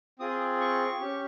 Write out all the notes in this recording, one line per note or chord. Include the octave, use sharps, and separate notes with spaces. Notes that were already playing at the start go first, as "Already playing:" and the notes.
C4 F4 G#4 D#6
C#6
C#4 G4